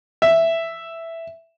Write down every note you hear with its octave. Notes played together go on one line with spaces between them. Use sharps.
E5